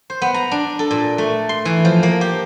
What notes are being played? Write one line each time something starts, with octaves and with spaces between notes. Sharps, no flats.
C5
B3
A#5
D4
A4
A#2
A3
C6
E3
F3
A#3
G4